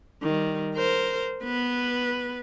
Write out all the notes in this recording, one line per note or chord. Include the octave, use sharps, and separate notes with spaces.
D#3 G3
A#4 C5
B3 B4